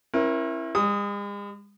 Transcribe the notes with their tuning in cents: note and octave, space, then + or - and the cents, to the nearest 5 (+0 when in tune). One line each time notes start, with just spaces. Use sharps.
C#4 -40 E4 +5 A#4 +25
G#3 -45 D#6 +0